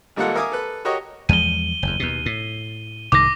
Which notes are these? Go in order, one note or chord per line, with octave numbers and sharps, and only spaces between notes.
G#1 G3 A#3 F4 A4 F#5
A#4 E5 F5 G#5 D6 D#6
A4 B4
F#4 G4 A#4 C#5 D#5
E2 F3 G#3 D#7 G7
F#1 E2
D#2 B2
A2
C2 G#2 D#3 D6 A#6